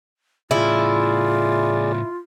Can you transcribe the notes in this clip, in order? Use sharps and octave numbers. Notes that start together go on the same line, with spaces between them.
A2 C#3 E4 F4 G#4 D5